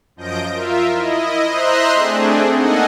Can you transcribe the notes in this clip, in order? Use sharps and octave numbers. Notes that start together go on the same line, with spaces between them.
F#2 F3 D#5 G6 A#6 D7
F4 A#4 E5
E4 D#5
C5 D#5 E5 A#5 C6 F#6
A3 C4 D4 G#4
A#3 D#4 A4 D#5 F#5 G#5